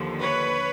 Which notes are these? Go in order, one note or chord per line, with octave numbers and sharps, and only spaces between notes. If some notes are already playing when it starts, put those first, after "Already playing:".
Already playing: D#2 D3 F3
B4 C#5